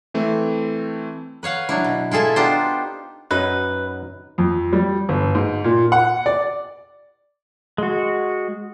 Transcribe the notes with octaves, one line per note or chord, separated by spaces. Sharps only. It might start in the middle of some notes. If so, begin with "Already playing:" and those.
E3 A3 C4
B4 C#5 F5 F#5
F#3 D4 E4
B2
E4 F4 G#4 A4 E5
B3 D4 D#4 F4 G4 C5
F#2 F#3 D#4 B4
F2
G3
G1
G#2
A#2
F#5
D5
G#3 F#4